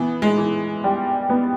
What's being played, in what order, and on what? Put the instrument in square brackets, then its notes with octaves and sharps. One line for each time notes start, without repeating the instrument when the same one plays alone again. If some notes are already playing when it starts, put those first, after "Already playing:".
Already playing: [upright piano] E3 [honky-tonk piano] B3
[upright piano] G#3
[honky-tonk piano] E3
G3
B3